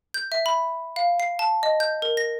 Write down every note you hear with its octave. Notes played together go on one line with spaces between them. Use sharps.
G6
E5
B5
F5
C7
A5
D#5
G6
A#4
A#6